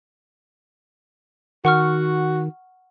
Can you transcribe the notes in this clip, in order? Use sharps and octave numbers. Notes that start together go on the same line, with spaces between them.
D#3 F#4 F#5 C#6 F6